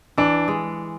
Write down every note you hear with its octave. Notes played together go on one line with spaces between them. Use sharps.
E3 D4
G#3